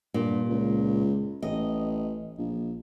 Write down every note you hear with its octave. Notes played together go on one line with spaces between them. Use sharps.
G2 A#2
C#2
A1 D#5
A#1